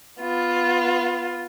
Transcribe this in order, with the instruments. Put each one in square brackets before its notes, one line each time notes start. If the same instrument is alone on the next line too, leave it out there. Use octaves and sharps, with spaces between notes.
[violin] B3 F4